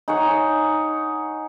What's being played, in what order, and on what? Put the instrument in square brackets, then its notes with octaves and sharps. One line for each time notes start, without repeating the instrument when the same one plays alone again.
[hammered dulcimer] D#4 G#4 C#5 F#5